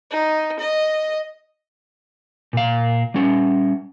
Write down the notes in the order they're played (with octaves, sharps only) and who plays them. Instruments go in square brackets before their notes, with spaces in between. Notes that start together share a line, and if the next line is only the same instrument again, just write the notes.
[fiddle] D#4
D#5
[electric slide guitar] A#2 F5
G3 C#4